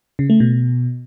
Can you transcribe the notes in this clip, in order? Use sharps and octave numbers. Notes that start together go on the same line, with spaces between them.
C#3
A3
B2